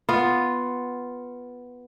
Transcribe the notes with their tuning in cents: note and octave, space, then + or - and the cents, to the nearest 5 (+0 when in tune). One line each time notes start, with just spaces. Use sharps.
B3 +0 F4 +0